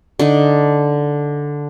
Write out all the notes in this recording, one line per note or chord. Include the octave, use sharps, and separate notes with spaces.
D3 D4 D#4